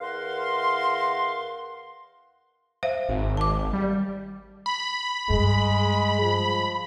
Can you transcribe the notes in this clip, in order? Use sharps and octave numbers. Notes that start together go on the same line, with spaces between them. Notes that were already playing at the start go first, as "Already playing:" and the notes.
E2 A#4 F5 F#5 C6
C5 E5 F5
G#1
A5 D6
G3
B5
G2 G#3
F3